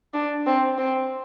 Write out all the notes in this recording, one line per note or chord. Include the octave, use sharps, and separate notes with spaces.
D4
C4
C4